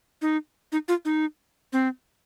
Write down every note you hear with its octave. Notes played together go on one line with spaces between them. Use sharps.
D#4
D#4
F4
D#4
C4